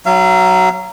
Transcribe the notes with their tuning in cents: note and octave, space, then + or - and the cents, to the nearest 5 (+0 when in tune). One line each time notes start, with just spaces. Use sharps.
F#3 +10 F5 -40